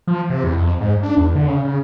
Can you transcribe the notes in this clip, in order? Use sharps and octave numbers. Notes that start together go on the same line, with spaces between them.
F3
C3
E2
F2
G#2
D4
E2
D3
C#3
C#3